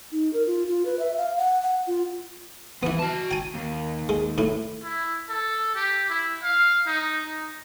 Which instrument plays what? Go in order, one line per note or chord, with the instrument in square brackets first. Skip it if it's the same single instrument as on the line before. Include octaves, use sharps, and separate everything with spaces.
[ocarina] D#4
A#4
F4
F4
B4
E5
F5
F#5
F#5
F4
[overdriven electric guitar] E3 [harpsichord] B3 E4
[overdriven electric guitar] F#4 A5
[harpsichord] G5 G#5
[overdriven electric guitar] D#2
[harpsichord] G#3
A2 E4
[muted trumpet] E4
A4
G4
E4
F5
D#4
D#4